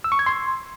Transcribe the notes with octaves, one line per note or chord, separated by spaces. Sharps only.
E6
C#6
G#6
C6